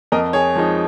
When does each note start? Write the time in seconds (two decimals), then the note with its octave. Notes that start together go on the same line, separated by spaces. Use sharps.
0.12 F2 A#4 D#5
0.33 G#4 C#5
0.56 F3 G#3 D#4